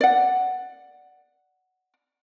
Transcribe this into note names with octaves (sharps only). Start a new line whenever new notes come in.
D5 F#5